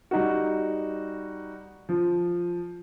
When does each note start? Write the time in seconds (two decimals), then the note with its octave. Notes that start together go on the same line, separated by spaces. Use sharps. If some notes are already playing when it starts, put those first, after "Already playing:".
0.11 G3 D#4 F#4
1.89 F3